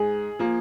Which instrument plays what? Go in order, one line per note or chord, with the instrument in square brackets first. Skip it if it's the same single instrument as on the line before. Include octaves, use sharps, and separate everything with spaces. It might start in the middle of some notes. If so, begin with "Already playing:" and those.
Already playing: [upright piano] G#2 [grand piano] G#4
[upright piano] F3 A#3